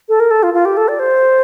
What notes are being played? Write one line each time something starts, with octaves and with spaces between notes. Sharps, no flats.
A4
A#4
A4
F4
F4
G4
A4
D5
C5